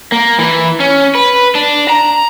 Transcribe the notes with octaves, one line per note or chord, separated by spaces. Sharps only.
A#3
E3
C#4
B4
D4
A#5